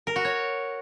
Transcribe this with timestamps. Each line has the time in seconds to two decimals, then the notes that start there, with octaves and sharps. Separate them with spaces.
0.07 A#4
0.16 F#4
0.25 C#5